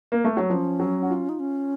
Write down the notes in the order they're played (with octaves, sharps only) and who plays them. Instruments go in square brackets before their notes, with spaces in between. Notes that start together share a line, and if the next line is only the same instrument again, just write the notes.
[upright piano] A#3
A3
F#3
[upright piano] F3 [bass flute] C#4
[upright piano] F#3
F#4
F4
[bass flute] D#4
C#4